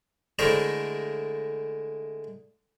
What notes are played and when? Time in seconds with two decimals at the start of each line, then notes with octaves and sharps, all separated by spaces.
0.39 D3 G#3 A3 E4 A#4 C5